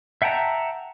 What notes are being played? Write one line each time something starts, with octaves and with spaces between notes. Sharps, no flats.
E5 F#5 G5 A5 A#5